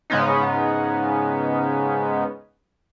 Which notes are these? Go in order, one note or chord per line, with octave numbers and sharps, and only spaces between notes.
G#2 C#3 G#3 B3 C#4 D#4